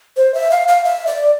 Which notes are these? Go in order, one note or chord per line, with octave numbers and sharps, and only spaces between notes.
C5
E5
F5
F5
E5
D5